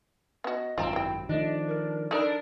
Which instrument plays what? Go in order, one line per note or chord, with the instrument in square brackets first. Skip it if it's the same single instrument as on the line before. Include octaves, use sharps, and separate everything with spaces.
[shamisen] B3 F#4 [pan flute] D#5
[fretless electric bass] G#1 F#2 [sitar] C4 [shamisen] F4 A#5
[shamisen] G3 G5 [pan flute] E4
[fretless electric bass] D#3 F3 A3 [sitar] D4 [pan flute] D#5
[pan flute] A#4
[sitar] D4 A#4 [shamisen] D#4 A4 [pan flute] D5